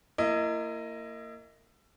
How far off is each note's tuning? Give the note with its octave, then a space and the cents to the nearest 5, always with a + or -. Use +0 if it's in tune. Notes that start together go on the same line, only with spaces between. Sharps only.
A#3 -20 E4 +30 D#5 +0